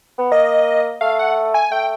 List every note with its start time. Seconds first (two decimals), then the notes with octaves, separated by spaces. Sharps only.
0.18 B3
0.32 A#3 D#5
1.01 A3 F5
1.19 F#5
1.54 G#5
1.71 A3 G5